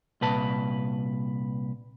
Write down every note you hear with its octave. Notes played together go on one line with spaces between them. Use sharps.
C2 A#2 B4 A5